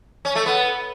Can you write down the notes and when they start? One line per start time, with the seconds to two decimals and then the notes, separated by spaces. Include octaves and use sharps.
0.25 C#4
0.35 A3
0.46 B3